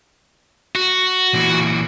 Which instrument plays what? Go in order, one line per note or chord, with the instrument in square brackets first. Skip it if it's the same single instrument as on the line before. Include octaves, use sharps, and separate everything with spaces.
[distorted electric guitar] F#4
[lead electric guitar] A#2 E3